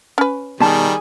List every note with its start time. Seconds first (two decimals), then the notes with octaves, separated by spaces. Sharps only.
0.18 C#4 B4
0.60 B2 D#3 G3 G#4 A5